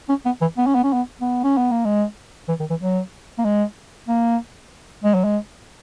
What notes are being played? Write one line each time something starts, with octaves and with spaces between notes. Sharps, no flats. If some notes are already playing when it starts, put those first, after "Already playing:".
C#4
B3
E3
B3
C#4
B3
C#4
B3
B3
C#4
B3
A#3
G#3
E3
D#3
E3
F#3
A#3
G#3
A#3
G#3
F#3
G#3